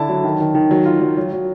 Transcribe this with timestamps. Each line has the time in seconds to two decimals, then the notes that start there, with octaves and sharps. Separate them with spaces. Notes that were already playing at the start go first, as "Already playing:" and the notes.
Already playing: D3 E4 A5
0.09 F#3
0.24 D#3
0.40 D#3
0.55 D#3
0.71 F#3
0.86 F4
1.01 F#3
1.17 F#3
1.33 F#3